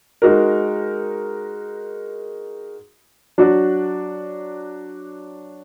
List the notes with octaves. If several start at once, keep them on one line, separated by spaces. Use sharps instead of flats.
G#3 D#4 F#4 A#4
F#3 D4 F#4 D5